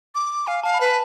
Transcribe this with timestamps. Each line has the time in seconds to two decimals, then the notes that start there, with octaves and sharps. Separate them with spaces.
0.15 D6
0.47 F5 G#5
0.63 F5 A5
0.74 B5
0.81 B4 A5